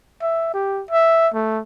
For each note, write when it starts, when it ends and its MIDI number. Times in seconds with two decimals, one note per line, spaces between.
0.22 0.51 76
0.54 0.83 67
0.91 1.29 76
1.34 1.61 57